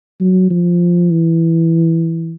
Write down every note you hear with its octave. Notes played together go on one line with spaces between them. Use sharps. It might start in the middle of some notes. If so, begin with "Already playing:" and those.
F#3
F3
E3